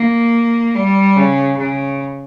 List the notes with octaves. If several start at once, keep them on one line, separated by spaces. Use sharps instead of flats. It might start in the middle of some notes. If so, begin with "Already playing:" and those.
Already playing: A#3
G3
C#3
C#3